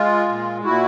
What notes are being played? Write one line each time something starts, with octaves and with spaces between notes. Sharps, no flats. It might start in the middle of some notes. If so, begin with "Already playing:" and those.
Already playing: G#3 F4
A#2
A#2 E4 F#4